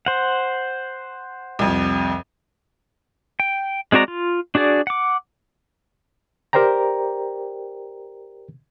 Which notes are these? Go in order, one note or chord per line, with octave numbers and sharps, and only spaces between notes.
C5 F#5
C2 F2
G5
G#3 C4 F#4 D5 A#5
F4
D4 F#4 G#4 D5
F#5 D6
G4 A#4 C5 D5 G5 A#5